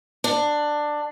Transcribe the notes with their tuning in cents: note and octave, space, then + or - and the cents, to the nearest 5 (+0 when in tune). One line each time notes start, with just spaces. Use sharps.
D4 +15